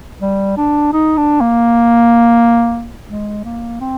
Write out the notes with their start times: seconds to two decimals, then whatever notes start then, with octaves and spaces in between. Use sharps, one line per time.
0.21 G3
0.57 D4
0.93 D#4
1.17 D4
1.41 A#3
3.08 G#3
3.45 A#3
3.81 C4